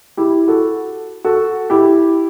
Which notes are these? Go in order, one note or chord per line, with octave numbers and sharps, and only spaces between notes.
E4 G4
F#4 A4
F#4 A4
E4 G4